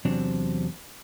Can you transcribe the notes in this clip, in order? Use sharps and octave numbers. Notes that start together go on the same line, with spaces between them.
E2 C3 F#3 C4 D4